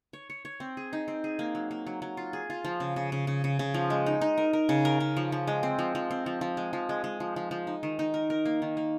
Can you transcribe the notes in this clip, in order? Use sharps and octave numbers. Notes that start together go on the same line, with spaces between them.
C#5
C#5
C#5
C4
G#4
D#4
C4
G#4
A#3
F#3
A#3
F#3
F#3
F4
G#4
F4
F3
C#3
C#3
C#3
C#3
C#3
C#3
F3
G#3
D#4
D#4
A#4
A#4
C#3
A#4
C#3
F3
F3
G#3
C4
F3
F3
C4
F3
F3
G#3
F3
G#3
G#3
F3
F3
F3
D#4
D#3
D#4
A#4
A#4
A#3
D#3
A#3